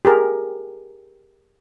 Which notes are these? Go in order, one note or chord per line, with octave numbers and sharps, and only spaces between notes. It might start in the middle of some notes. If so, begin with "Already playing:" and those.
G4 G#4 A#4